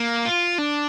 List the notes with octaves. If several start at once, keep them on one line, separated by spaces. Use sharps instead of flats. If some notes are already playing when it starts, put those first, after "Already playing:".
Already playing: A#3
F4
D4